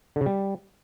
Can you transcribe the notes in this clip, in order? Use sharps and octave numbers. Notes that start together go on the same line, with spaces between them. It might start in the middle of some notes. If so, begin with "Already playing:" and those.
D3
C#3
G3